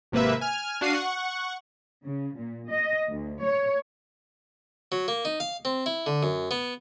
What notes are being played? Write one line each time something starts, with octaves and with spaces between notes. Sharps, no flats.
G#1 C3 A#3 B4 E5
G#5 F6
D4 F#4 F5 C7 D#7
F#5 C#6
C#3
A#2
D#5
D2
C#5
F#3
A#3
D#4
F5
C4
E4
D3
F#2
B3